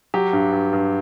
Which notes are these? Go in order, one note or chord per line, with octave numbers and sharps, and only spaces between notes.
F#3 G4
G2
G2
G2